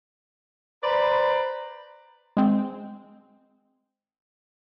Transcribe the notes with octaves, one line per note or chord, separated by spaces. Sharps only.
B4 C5 D5 A#5 B5
G#3 C4